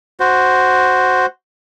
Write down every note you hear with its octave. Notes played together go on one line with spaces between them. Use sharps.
F#4 C5